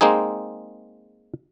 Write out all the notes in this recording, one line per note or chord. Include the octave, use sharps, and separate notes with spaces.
G#3 A#3 C4 D#4 G#4